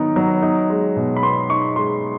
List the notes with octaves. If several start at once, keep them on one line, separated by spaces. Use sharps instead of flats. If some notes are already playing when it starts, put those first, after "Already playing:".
Already playing: D#3 F#3 B3 D#4 A#5
F#3
D#4
G#3
B2
B5
B3 C6
D#4 C#6
G#3 C6